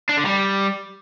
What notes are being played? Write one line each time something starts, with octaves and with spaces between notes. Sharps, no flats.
D4
D3
G3